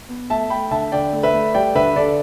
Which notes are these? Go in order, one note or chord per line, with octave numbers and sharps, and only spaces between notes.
B3
A3 E5 A5
A3 G5 B5
D3 E5 A5
D3 D5 G5
A3
B4 E5
A3
G3 D5 G5
D3 B4 E5
D3 A4 D5